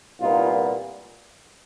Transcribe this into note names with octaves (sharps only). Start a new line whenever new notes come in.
C2 A#2 G3 B3 D#4 F4